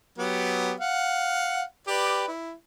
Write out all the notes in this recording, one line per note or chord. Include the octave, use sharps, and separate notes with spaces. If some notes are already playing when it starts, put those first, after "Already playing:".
F#3 B3 G4
F5 F#5
G4 B4 D5
E4